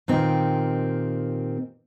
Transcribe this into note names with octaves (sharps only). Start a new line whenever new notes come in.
A#2 D#3 C4 G4